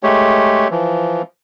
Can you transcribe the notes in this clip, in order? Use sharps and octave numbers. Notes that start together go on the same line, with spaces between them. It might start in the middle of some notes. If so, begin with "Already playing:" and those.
G#3 A3 G4 C#5
E3 F3